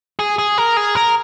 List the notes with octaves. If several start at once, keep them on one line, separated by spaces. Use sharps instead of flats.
G#4
G#4
A#4
G#4
A#4